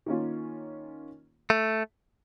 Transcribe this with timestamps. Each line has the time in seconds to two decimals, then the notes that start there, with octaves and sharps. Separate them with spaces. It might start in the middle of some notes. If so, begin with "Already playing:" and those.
0.06 D#3 A#3 C#4 F4
1.50 A3